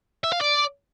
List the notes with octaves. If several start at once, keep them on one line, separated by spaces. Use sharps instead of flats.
E5
F5
D5